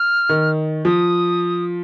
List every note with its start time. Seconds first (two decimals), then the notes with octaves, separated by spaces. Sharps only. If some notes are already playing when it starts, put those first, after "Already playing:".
Already playing: F6
0.29 D#3
0.85 F3 D#6